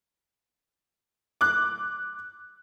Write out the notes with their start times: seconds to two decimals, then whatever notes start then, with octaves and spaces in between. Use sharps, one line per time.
1.41 D6 F#6